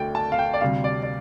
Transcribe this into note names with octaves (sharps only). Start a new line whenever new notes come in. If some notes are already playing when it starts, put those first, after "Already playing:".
Already playing: D2 D3 A3 D5 G5
A5
F5
G5
D5
D2 C3 G3 F5
D5
D5